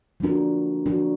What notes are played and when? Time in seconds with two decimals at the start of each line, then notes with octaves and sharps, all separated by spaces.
0.20 F3 A#3 D4 F#4 A#4
0.86 F3 A#3 D4 F#4 A#4